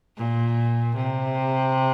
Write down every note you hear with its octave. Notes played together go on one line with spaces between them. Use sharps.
A#2
C3